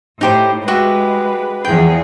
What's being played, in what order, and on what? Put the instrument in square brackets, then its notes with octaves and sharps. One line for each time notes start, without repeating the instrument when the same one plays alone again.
[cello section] A2 [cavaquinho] D#4 G4 C5
[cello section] G#3 [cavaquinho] F#4 G4 E5 [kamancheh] B4
[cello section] E2 F3 G#4 [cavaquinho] G5